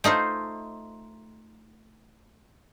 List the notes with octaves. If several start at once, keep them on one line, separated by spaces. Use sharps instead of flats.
A3 D#4 F4 C5